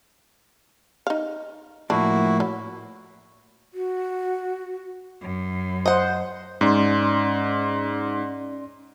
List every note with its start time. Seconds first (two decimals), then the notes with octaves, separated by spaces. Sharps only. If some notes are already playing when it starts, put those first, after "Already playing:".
1.07 D#4 F5
1.90 A2 F3 A#3 D4 E4 F#4
2.40 F#3
3.74 F#4
5.21 F#2
5.86 C5 D#5 F#5
6.61 G#2 C#4 D5 C6